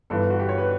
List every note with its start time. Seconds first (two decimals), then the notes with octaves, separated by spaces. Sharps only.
0.10 G1 G2 E3 B3 A4
0.30 F#4
0.39 G4
0.49 C#5
0.58 B4